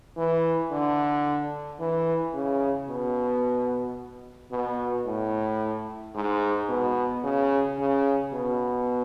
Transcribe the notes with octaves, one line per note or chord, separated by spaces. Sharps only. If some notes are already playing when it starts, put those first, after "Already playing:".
E3
D3
E3
C#3
B2
B2
A2
G#2
B2
C#3
C#3
B2